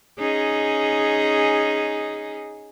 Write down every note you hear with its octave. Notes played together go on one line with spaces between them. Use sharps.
C#4 D#4 G#4